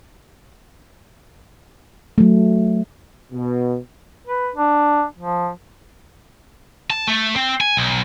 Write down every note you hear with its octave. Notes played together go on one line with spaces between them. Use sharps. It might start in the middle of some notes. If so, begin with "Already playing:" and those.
F#3 A3
B2
B4
D4
F3
A5
A3
C4
G#5
B1